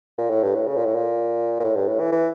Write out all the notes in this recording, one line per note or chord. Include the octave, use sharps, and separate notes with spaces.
A#2
A2
G2
A2
C#3
A#2
A2
A#2
A#2
A2
G2
A2
E3
E3